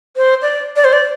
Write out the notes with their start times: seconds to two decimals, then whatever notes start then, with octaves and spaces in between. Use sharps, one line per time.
0.17 C5
0.42 D5
0.76 D5
0.85 C5
0.93 D5